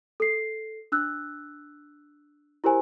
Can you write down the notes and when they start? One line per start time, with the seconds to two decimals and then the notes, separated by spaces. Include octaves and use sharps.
0.20 A4 C7
0.92 D4 E6 F#6
2.64 E4 G4 A#4 C5 G#5